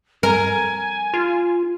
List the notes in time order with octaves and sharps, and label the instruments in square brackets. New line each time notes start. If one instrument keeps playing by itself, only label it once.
[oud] A#4 [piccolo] G#5
[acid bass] F4